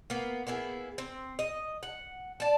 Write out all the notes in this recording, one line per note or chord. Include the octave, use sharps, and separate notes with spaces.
A#3 B3
A#3 B3 E4 G#4
C4
D#5
F#5
D5 A5